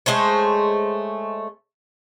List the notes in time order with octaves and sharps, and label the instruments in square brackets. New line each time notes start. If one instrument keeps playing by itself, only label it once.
[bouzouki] G#3 A3 C5 C#5